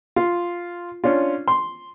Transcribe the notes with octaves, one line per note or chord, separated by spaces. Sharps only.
F4
C#4 D4 F4
C6